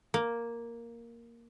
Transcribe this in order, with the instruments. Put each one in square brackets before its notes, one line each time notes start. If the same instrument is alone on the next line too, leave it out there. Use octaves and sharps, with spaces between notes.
[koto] A#3